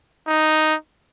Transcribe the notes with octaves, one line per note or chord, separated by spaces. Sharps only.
D#4